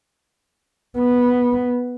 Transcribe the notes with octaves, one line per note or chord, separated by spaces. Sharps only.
B3